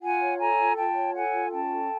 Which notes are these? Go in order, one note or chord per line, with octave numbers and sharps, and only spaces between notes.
F4 F#5 G#5
C#5
A4 G#5 A#5
F4
F4 G5 A5
C#5
A4 F#5 G#5
F4
C#4 G5 A5
A4